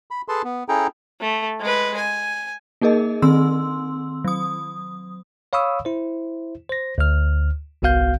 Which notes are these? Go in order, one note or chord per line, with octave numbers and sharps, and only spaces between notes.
B5
G#4 A4 B4 A5 C6
B3
C#4 E4 G#4 A4 G5 A#5
A3
G#3 B4
G#5
A#3 D#4 G#4 A#4 D#5
D#3 C4 C6 E6
F#3 D#6
C#5 F5 B5 C#6 D#6 E6
E4 C5
C5 A#6
D2 F6
G1 C2 B3 F#4 F5 G6